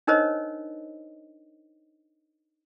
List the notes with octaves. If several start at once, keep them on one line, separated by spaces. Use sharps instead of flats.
D4 D#4 A#4 C5 C#5 D#5